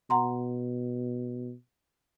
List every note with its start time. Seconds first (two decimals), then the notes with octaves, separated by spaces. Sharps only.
0.10 B2 F#5 A#5 C6